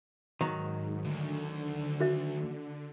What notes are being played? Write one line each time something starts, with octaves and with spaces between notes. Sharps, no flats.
G#2 D#3 F#3
D2 D3
F#4 E5